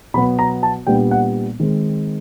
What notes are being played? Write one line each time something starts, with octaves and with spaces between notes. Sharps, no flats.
B2 F#3 B3 B5
A#5
A5
A#2 G3 B3 D4 G5
F#5
D#3 G#3 C4